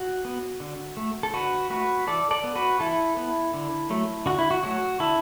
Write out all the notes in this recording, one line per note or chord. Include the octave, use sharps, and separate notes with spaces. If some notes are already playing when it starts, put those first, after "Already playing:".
Already playing: F#4
B3
D3
A3
A4
D3 F#4 B4
A3 F#4 B4
E3 A4 D5
A4 D5
B3
F#4 B4
E3 E4 A4
B3
D3
F#3 A3
D3 F#4
E4
F#4
F#3 A3 F#4
D3 E4 A4